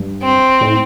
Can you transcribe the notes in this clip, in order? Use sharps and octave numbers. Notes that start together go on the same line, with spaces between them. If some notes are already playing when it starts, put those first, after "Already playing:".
Already playing: G2
C4
A2